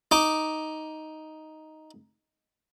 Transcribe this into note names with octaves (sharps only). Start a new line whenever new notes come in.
D#4 D6